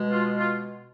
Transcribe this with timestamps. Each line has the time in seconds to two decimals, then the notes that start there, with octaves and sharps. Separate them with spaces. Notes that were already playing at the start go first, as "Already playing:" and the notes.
Already playing: B2 G#3
0.11 F4
0.38 F4